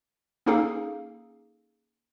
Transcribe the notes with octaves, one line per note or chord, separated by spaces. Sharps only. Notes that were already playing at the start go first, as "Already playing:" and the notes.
A#3 C#4 D#4 G#4 A4 F5